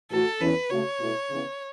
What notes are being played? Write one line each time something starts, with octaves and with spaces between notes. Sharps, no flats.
A2 E3 A3 F#4 A4
E2 E3 C#4 B4
C#3 A3 F#4 C#5
B2 A3 E4
C#3 E3 B3